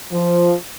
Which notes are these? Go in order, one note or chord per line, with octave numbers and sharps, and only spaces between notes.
F3